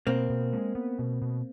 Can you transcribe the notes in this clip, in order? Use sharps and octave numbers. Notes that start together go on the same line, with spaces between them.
B2 A#3 C4
B2
G#3
B3
B2
B2